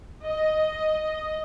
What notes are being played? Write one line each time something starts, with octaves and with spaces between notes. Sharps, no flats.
D#5